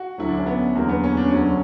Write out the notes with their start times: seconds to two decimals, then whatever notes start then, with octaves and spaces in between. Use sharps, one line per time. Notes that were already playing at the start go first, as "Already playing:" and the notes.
Already playing: F#4
0.18 D2 D3 F#3 E4
0.29 D4
0.38 C#4
0.46 B3
0.75 E2 D3 F#3 A#3
0.89 B3
1.04 C#4
1.17 D4
1.31 D2 D3 F#3 C#4